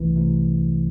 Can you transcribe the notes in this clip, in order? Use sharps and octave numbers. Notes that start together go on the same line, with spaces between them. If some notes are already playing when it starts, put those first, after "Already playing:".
Already playing: C2 C3 E3 A3 E4
C2 C3 E3 A3 E4